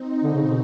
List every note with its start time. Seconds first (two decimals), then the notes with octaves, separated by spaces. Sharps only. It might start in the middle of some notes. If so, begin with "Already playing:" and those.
Already playing: C4 D#4
0.23 D3
0.34 C#3
0.43 B2